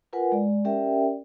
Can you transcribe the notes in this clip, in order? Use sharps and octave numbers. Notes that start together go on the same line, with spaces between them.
F4 A#4 B4 F#5 G#5
G#3 D5
C#4 G4 A#4 D5 E5 G5